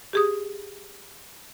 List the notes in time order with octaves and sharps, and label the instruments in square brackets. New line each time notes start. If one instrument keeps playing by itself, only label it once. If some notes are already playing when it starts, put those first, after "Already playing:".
[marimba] G4 G#4 D#6